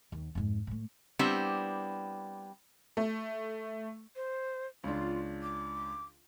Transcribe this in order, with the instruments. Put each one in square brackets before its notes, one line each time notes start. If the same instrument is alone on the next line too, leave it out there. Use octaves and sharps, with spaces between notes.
[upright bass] D#2
F2 G#2
A2 A3
[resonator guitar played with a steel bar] G3 B3 C4 D4 E4 G4
[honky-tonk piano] A3
[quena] C5
[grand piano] C#2 D4 [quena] F4
[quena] D6